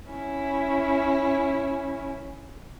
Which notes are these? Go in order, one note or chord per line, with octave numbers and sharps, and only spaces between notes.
C#4 E4 G#5